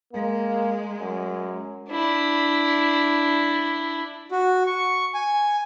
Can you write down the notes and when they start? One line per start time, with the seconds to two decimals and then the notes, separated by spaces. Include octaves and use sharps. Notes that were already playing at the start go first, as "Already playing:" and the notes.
0.13 G#3 A#3
1.00 F#2
1.90 D4 E4
4.31 F#4
4.67 C#6
5.14 G#5